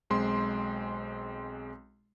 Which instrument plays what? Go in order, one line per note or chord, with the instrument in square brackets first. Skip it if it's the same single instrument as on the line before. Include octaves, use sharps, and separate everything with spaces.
[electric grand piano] B1 G#3 C4 C6